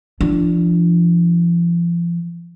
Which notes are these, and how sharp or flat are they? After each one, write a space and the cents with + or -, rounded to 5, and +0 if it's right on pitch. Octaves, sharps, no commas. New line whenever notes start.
F3 -35 D4 +0